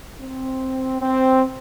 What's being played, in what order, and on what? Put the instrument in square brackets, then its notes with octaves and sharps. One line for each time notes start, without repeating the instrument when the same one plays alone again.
[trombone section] C4
C4